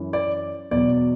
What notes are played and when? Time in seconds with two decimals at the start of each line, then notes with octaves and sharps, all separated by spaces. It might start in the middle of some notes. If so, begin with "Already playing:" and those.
Already playing: F#2 E3
0.13 D5
0.71 E2 B2 F#3 D5